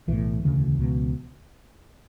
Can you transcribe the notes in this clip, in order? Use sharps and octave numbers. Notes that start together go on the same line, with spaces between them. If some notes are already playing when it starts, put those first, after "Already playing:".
B1 A2 E3
E1 D2 C#3
C#2 B2